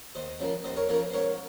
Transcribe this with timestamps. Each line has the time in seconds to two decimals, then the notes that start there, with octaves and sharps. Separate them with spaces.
0.15 D#2 C5 D#5
0.40 C#3 F3 A#3
0.64 D#2 C5 D#5
0.76 A#4 C#5
0.89 C#3 F3 A#3 A#4 C#5
1.10 C5
1.13 G#2 A#4 C#5